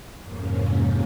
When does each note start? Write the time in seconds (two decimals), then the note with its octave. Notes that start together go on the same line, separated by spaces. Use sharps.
0.20 F2 G#2 C3 A#3 C#4